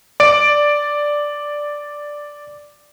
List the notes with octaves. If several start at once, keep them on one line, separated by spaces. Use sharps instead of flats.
D5 D7